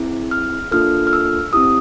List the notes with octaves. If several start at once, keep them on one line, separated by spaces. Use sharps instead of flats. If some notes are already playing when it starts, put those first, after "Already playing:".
Already playing: C4 E4 G#4
F6
A#3 D4 F4 A4 F6
F6
E6
C4 E4 G4 D#6